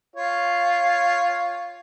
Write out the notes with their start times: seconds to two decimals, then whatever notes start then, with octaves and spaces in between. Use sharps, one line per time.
0.16 F4 C#5